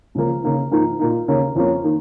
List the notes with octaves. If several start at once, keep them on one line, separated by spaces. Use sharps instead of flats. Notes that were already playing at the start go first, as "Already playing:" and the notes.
C#2 C#3 F3 A#3
C#3 A#3 D#4
G#2 F3 A#3 D#4
A#2 A#3 D#4
D#2 C#3 A#3 C#4
F2 F3 A#3 C#4
D#3 A#3